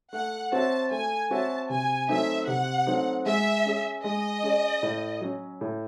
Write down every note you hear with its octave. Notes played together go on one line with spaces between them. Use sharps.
A3 F#5
C4 F#4 C#5 E5 A5
A3 G#5
C4 F#4 C#5 E5 A5
C3 G#5
F#3 A3 C4 D#4 E5
C3 F#5
F#3 A3 C4 D#4
G#3 E5
C#4 G#4
G#3 D#5
C#4 G#4
A2
F#3 C#4
A2